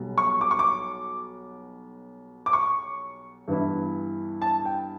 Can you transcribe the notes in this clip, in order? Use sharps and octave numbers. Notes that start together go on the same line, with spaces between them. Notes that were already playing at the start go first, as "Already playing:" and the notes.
Already playing: B1 B2 G3
C#6
D6
C#6
D6
D6
C#6
G2 E3 B3 E4
A5
G5